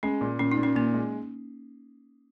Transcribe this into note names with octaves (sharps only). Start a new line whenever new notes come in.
G#3 C#4
A#2
A#2 C#4
D#4
A#2
C#4
A#2 A#3
G#3